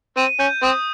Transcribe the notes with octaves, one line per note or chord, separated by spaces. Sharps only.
C4 D#7
C#4 G6
C4 D#6